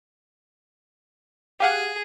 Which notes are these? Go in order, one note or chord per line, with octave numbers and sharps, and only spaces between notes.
G4 G#4 F5 F#5